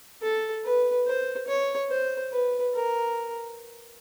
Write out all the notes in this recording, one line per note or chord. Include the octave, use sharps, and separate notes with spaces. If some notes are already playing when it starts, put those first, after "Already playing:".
A4
B4
C5
C#5
C5
B4
A#4